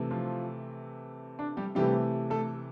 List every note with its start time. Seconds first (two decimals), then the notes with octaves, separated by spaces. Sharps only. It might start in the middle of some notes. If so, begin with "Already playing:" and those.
Already playing: C3 E3 A3
0.11 F3 F4
1.39 D4
1.57 G3 G4
1.75 C3 E3 G3 A3 G4
2.30 A3 A4